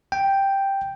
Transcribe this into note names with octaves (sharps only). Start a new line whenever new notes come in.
G5